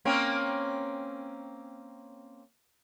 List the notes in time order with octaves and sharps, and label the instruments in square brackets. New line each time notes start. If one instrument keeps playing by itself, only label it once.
[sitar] A#3 C4 C#4